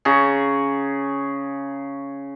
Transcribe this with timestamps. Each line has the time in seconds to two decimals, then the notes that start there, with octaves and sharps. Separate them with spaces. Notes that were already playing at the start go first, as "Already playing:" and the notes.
0.05 C#3 G#4 C#5 A#5